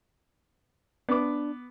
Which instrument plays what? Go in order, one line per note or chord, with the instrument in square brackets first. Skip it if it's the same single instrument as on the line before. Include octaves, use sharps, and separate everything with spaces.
[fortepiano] B3 D6 [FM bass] D4